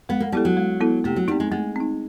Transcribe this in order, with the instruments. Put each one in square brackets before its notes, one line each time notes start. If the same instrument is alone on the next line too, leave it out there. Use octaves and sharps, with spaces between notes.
[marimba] G#3 [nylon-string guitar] B3
[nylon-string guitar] A#3
[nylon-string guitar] G3 [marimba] B3 E4 A4
[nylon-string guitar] F#3
[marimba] G#3
B3 E4 A4
[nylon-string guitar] C3 [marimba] A3
[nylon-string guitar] F#3
[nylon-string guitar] G3 [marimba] C4 D#4
[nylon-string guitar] G#3
[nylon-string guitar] G#3 [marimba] A3
[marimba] C4 D#4